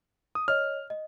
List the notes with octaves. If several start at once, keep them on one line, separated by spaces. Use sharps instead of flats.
D#6
C#5 D#5 F6
D#5